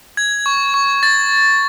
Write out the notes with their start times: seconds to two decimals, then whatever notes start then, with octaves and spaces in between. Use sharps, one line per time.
0.17 G#6
0.46 C#6
0.74 C#6
1.03 A6